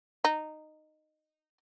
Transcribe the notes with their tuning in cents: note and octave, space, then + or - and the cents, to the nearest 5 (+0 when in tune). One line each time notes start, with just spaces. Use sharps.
D#4 -10